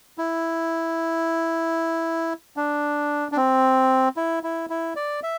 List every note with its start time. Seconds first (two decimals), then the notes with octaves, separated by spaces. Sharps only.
0.18 E4
2.57 D4
3.32 D4
3.37 C4
4.17 E4
4.43 E4
4.70 E4
4.96 D5
5.23 E5